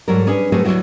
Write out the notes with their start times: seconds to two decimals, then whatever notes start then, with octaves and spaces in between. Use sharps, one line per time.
0.08 G#2 F#3 G3 A4 A#4
0.27 C#4 D4 G#4 B4 C#5
0.52 F#3 A3 C4 G#4 A#4 B4
0.64 D2 G2 F#3 E4 F#4